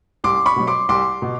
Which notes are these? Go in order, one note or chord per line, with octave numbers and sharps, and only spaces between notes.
C2 C6 D6
B5 C#6
B2 F#3
C6 D6
C2 C6 D6
B2